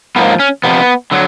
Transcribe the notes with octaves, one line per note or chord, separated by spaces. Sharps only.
G#2 F3 A#3 B3
C#4
F2 C3 F3 B3
D3 F#3